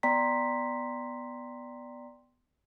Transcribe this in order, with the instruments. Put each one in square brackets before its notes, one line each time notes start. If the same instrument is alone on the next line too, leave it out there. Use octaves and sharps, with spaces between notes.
[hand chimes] B3 D5 G5 A#5 C6 B6